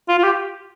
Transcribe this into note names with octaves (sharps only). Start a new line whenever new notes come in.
F4
F4
G4